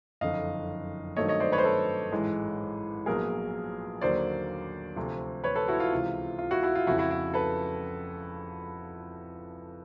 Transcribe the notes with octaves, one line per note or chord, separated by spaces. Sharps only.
F#1 F2 D3 D#5 F5
G2 D#3 F#3 A3 C4 C#5 D#5
C#5 D#5
C5 D5
B4 C#5
C5
A4 B4
A1 G#2 E3 G#3
A#1 A#2 F#3 B3 G#4 A#4
D#2 D3 F#3 A#3 C5 D5
D2 C3 F3
B4 C#5
A4 B4
E4 F#4
F4
C#2 C3 E3
F4
E4 F#4
E4 F#4
F4
F1 F2 C#3 F3 E4 F#4
E4 F#4
E4
A4 B4